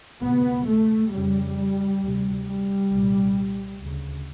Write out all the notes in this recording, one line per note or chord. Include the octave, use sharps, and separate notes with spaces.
D2 C3 B3
A3
F2 C#3 G3
D2 C3
G3
C2 A#2
D2 C#3